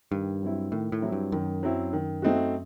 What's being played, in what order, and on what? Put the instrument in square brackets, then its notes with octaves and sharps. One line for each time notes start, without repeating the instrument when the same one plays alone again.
[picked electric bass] G2 [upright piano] D#3
[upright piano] F#3 C4 E4
[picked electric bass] A2 [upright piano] D#3
[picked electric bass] A2
[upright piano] F#3 C4 E4
[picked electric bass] G2
[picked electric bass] F#2 [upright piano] D#3
[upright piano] F#3 C4 E4
D#3
A3 C4 D#4 F#4